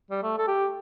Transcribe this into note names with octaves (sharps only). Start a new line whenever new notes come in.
G3
A3
A4
G4